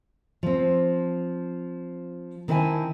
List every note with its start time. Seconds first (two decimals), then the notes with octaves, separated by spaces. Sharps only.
0.43 F3 C4
2.48 D#3 C4 E4 F5 G#5 A5